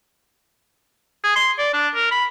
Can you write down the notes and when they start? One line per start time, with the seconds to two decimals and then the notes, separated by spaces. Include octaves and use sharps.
1.24 G#4
1.36 C6
1.59 D5
1.74 D4
1.95 A#4
2.11 B5